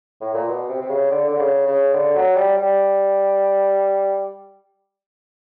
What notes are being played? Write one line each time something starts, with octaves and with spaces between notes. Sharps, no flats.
A2
A#2
B2
C3
C3
C#3
D3
D3
C#3
C#3
D3
F#3
G3
G3